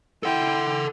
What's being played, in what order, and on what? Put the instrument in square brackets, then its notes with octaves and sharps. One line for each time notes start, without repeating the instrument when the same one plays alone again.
[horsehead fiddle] E4 G5 [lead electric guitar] A4 F#5